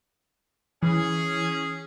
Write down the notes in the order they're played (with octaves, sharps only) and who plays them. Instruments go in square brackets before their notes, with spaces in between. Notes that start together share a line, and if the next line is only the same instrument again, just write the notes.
[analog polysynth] E3 [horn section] C#4 G#4